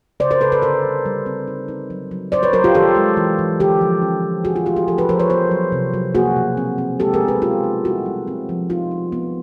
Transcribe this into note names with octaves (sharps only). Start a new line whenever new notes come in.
C#3 C5 D5
A#4 C5
C#3 A4 B4
A4 B4
D3 A#4 C5
G3
G3
C4
D#4
D#4
F#3
F#3
F#3 C5 D5
B4 C#5
F#3 A#4 C5
F4 G4
D#3 G4 A4
G#3
E3
E3
D3 G4 A4
F3
C#4
D#3
F3 F#4 G#4
F4
A3 F4 G4
F#4 G#4
F3 G4 A4
A4 B4
F3 A#4 C5
B4 C#5
B3 A#4 C5
F#3
C3
F#3
A#3 F#4 G#4
B2
C4
C4
G#3 G4 A4
G#4 A#4
B3
A4 B4
F#3 F4 G4
D#4
G3 E4 F#4
G3
C4
F3
D#4 F4
D#4
B3